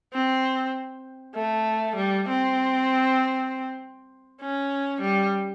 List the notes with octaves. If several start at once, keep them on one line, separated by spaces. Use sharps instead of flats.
C4
A3
G3
C4
C#4
G3